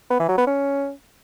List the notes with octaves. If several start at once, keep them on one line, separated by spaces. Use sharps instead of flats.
B3
E3
F#3
B3
C#4